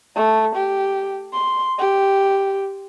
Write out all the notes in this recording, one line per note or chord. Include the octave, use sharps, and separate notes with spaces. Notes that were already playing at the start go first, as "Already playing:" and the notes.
A3
G4
C6
G4